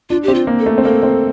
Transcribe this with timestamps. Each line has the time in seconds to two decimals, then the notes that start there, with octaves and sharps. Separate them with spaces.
0.10 D4 F4
0.23 C4 G4
0.35 F4
0.47 A#3
0.59 A4
0.66 A3
0.78 C4
0.84 A#3 A4
1.03 C4